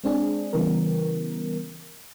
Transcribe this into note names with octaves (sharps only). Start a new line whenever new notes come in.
G#3 C4 D4 G#4
C#3 E3 G3 B3 A#4